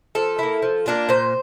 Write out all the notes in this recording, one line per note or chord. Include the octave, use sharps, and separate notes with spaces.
F3 A4
A#3 E4
F3
A#3 D4 F4
A#2 C5